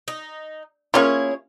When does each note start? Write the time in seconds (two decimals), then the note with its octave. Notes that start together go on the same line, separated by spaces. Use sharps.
0.08 D#4
0.94 A#3 C#4 E4 F4 G#4 C#5